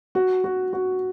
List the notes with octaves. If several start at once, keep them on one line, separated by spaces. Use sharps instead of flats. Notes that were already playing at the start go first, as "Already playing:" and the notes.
F#4
F#4
F#4